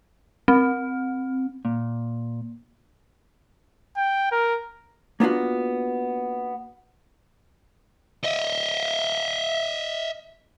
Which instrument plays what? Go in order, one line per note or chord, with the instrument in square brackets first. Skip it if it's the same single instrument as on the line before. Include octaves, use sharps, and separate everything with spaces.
[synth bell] C4
[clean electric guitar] A#2
[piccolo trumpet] G5
A#4
[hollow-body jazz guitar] A#3 B3 D4 F4 F#4
[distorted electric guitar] D#5 E5